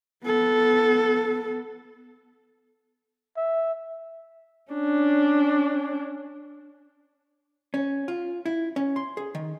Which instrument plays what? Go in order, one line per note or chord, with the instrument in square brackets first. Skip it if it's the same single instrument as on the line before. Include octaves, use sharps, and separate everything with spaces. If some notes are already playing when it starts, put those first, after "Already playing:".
[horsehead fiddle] B3 A4
[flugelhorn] E5
[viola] C#4 D4
[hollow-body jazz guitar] C#4
F4
E4
C#4
C6
G#4
D#3